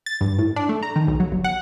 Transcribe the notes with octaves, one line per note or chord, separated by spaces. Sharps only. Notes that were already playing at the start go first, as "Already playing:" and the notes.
A6
G2
A2
D4
A3
A#5
D#3
B1
F#3
G1
F#5